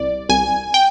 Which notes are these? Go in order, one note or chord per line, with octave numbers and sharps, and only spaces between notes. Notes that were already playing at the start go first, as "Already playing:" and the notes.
Already playing: C2 D5
C2 G#5
G5